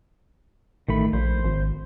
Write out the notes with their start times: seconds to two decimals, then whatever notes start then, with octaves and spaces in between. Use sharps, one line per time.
0.88 A1 D#3 A3 B5
1.13 A#1 C5
1.44 G#1